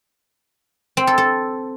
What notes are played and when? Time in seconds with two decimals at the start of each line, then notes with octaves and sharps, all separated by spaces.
0.97 C4
1.07 A4
1.18 A4